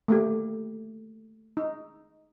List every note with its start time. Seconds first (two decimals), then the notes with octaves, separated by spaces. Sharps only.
0.08 A3 A#3 G4
1.57 D#4